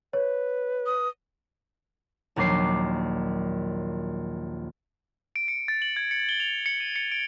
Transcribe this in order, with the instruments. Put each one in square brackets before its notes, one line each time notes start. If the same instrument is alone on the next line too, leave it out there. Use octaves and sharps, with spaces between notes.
[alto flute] B4 [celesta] C#5
[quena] D#6
[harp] A#1 D#2 F#3 D6 C7
[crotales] D7
C#7
A6
F#7
G#6
C#7
G7
F7
C#7
D#7
C#7
D7